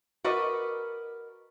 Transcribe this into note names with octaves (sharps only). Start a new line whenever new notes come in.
F#4 A#4 B4 D5 D#5